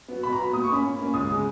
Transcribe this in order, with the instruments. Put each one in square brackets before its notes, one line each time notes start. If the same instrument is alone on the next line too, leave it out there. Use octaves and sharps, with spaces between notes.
[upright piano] F#3 B3
B2 B5
A#5
F#3 B3 B5
A#2 D#6
C#6
A#3 C#4 B5
A#2
A#3 C#4
C#2 D#6
C#3 G#3